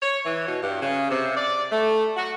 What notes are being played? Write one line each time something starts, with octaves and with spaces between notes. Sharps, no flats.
C#5
E3
B2
G2
C#3
C3
D5
A3
F#4